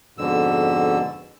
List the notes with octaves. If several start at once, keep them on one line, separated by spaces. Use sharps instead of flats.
F2 G#2 B2 D3 E6